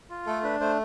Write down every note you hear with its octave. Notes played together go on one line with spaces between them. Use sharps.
F4
A3 A4
D4 B4
A3 C5